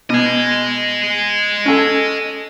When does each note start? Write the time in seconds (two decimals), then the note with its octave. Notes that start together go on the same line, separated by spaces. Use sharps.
0.10 B2 D#5 G#5
1.66 C#4 A4